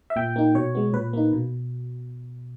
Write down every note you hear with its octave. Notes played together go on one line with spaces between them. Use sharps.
E5
A#2 G5
A#3 D#4
B2 C#5
G#3 B3
A#2 B4
A#3 D#4
B2